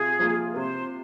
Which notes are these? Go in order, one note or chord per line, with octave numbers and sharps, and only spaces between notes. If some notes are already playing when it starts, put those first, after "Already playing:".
Already playing: C3 F4 G#4
F3 A#3 F4
A#4
C3 C5